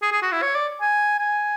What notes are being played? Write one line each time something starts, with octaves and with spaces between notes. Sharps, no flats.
G#4
G#4
F#4
E4
C#5
D5
G#5
G#5